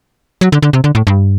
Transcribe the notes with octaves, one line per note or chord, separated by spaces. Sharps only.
F#3
D3
D3
C3
D3
A2
G2